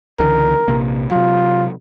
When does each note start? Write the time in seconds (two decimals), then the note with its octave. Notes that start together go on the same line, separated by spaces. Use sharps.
0.19 C#2 D3 E3 A#4
0.68 A#1 C3 A#3
1.11 C3 F#3 F4